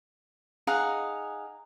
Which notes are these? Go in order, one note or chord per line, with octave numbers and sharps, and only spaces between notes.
D#4 G#4 F5 F#5